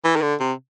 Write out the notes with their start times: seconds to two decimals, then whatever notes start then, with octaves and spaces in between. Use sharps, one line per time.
0.05 E3
0.16 D#3
0.22 D3
0.40 C3